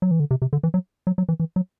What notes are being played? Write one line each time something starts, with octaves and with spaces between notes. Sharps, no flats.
F#3
E3
D3
C3
C3
D3
E3
F#3
F#3
F#3
E3
E3
F#3